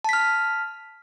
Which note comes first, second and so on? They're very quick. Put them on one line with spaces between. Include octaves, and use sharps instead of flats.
A5 B6 F6